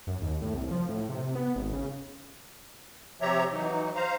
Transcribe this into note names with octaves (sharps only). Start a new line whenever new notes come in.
F#2
D#2
A2
C2
F3
A2
C3
B3
G#1
C#3
C3 F3 G4 C#5 E5 A#5
E3 F#3 D#4
C5 F5 A#5